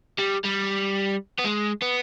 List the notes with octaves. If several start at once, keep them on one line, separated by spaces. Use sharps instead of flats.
G3
G3
B3
G#3
B3